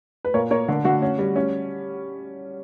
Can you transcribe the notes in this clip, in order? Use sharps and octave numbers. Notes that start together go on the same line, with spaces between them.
B4
A#2 A#4 C#5
A#3 A#4 C#5
D3
D3 F#4
C#4
G3
C#4